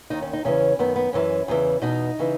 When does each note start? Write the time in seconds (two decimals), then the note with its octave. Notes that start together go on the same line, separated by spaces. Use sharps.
0.10 D#2 D#3 D#4
0.22 C#4
0.33 D#4
0.45 E2 C#3 E3 C#4
0.79 F#2 D#3 B3
0.96 B3
1.13 F#2 E3 C#4
1.48 E2 C#3 E3
1.82 E2 B2 D#4
2.19 C#3 E3